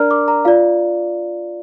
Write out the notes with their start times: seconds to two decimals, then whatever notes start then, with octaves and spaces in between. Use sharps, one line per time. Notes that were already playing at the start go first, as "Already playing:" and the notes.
Already playing: D4 A#4 D5 A#5 F6
0.11 D6
0.28 A#5
0.45 F4 D5 F5